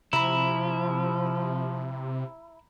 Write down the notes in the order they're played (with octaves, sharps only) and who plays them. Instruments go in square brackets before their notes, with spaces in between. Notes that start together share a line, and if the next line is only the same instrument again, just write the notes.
[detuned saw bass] C3 [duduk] F3 [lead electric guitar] E4 [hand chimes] A#5 B5